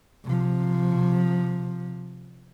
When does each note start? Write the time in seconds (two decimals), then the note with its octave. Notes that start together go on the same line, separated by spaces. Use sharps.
0.25 C3 F3